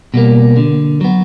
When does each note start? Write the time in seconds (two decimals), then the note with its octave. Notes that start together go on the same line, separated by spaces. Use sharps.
0.14 B2 G3 A#3
0.57 D3
1.01 F#3 B3